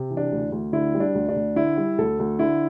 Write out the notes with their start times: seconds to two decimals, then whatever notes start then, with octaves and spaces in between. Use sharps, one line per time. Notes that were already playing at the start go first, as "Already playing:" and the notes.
Already playing: C3
0.11 E3
0.17 D4
0.32 D2
0.52 D2
0.73 D3 E4
0.95 G3
1.00 D4
1.15 D2
1.29 D4
1.36 D2
1.56 D3 E4
1.77 G3
1.98 D2 A4
2.19 D2
2.39 D3 E4